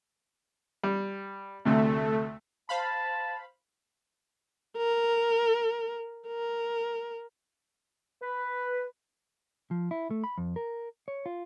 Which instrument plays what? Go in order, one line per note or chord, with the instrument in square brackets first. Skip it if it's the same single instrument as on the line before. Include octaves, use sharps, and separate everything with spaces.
[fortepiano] G3
[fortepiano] D2 C3 [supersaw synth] A3
[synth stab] C5 F5 B5 [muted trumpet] A5
[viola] A#4
A#4
[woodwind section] B4
[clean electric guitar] F3
E4
A3
B5
F2
A#4
C#5
F4